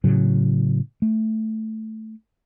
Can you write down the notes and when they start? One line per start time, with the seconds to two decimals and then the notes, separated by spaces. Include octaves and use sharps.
0.04 A2 C#3 F#3
1.02 A3